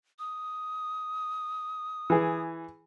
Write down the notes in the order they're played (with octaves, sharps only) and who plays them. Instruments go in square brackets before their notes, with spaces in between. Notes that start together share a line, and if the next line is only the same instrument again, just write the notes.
[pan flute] D#6
[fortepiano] E3 G#4